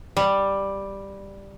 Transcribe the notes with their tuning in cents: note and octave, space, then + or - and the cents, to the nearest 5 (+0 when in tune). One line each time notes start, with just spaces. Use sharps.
G3 +5